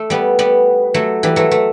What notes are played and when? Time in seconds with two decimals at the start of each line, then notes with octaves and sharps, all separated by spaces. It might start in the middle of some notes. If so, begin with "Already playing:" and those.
Already playing: A3
0.10 G3 B3
0.39 G3 B3
0.94 F#3 A3
1.23 E3 G3
1.36 F#3 A3
1.51 A3